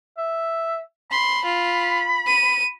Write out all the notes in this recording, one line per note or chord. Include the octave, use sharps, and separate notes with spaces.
E5
B5 C6
F4
D#7